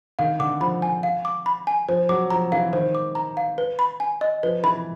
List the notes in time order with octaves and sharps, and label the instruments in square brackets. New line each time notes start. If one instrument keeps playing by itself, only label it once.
[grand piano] D#3 [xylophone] F5
[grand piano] D3 [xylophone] D6
[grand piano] F3 [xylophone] B5
[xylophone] G#5
F5
D6
B5
G#5
[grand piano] F3 [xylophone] C5
[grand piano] F#3 [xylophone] D6
[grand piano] F3 [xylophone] A#5
[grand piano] E3 [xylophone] F5
[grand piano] D#3 [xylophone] C5
[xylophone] D6
A#5
F5
B4
B5
G#5
D#5
[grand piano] F3 [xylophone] B4
[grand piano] E3 [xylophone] B5